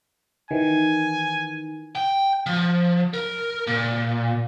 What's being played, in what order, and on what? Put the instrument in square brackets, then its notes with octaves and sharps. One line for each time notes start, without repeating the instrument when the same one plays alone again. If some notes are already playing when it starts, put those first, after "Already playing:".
[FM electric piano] D#3 E3 [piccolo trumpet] G#5
[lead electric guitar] G5
F3
A#4
A#2